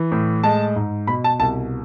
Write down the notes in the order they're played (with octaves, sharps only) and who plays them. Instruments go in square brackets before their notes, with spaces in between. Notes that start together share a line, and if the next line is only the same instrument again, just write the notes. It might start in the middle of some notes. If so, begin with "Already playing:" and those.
Already playing: [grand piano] E3
A2
G#3 A5
G#2
B2 B5
A5
C2 A5